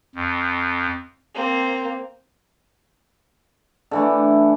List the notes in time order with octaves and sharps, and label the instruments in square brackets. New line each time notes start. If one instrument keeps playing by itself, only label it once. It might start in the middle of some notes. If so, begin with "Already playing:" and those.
[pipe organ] F2
[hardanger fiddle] A#3 C4
[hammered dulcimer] D3 E3 A3